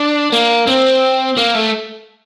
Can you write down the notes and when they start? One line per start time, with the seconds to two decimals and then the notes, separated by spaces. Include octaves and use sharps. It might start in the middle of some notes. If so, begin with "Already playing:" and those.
Already playing: D4
0.33 A#3
0.68 C4
1.37 A#3
1.55 A3